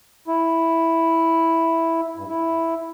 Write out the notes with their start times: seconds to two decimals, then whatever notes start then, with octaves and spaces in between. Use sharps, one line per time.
0.28 E4
2.17 G2
2.29 E4